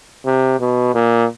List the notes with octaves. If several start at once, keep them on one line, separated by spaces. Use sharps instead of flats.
C3
B2
A#2